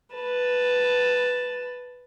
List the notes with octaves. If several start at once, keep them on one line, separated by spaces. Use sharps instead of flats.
B4 A5